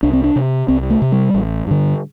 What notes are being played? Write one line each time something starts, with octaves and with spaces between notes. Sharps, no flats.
C2 D4
C4
D4
C3
C2 C4
A3
C3
G3
A1
G2 D3